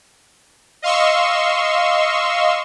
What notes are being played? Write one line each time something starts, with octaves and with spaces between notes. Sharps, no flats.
D#5 F5 C6 C#6 E6